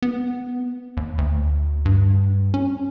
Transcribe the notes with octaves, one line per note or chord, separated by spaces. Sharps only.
B3
D#2
D2
G2
C#4